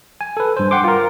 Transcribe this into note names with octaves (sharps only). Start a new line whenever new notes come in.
G#5
A4 B4
G2 C5
F#5 G5 C6 D6
F4 A#4